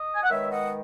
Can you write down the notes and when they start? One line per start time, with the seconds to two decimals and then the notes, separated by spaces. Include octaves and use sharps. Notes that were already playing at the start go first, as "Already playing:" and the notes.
Already playing: D#5
0.15 G#5
0.23 F#5
0.30 D#3 G#3 B3 C#5 E5
0.50 D#5 F#5